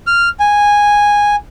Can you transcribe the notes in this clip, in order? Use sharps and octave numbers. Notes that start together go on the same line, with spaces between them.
F6
G#5